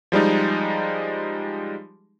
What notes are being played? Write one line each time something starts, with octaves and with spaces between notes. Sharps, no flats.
F3 G3 G#3 D#4